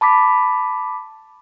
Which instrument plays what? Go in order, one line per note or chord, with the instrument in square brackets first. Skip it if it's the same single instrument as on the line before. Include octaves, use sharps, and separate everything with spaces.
[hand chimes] A5 B5 D6 B6